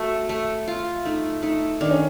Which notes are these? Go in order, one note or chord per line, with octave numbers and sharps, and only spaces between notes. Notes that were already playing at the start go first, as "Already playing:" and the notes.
Already playing: A3 F#4
A3
F4
A3 D#4
A3 D#4
D#3 D4
C#4